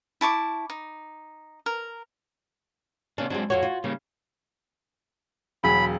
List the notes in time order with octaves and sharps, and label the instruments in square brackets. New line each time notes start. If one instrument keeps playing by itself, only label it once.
[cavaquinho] E4 A5 C#6 D6
D#4
A#4
[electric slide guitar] C3 A#3 D4 [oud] C#4
[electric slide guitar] F#2 C4 D4 [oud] F#3 G#3
[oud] F2 F4 C#5 [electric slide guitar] F#4
[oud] F4
[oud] C#3 [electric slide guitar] G3 A#3 C#4
[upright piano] E1 F#3 G#4 [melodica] B5